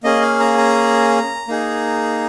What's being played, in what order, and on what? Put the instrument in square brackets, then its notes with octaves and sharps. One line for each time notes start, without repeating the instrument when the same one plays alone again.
[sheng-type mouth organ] A#3 C#4 G#4 D#5
F5
A#5
A#5
A#3 D#4 G#4